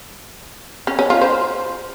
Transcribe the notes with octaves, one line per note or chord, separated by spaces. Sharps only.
C#4
C#4
F4
C5